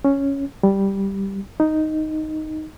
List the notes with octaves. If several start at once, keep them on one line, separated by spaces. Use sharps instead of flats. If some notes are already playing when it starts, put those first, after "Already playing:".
C#4
G3
D#4